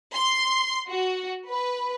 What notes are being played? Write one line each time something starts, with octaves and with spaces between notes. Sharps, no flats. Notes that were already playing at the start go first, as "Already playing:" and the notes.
C6
F#4
B4